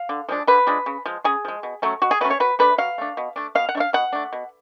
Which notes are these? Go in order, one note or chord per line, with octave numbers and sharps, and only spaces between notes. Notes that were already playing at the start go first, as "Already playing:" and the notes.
Already playing: F5
D3
F3 G#3 D4
D3 B4
F3 G#3 D4
C#3
F3 G#3
C#3 G#4
F3 G#3
B2
F#3 A3 C#4
B2 F#4
G#4
F#3 A3 C#4 B4
C#5
F#3 B4
A3 D4 B4
F#3 F5
A3 D4
B2
A3 D4
B2 F5
F#5
A3 D4
F5
B2 F#5
A3 D4
B2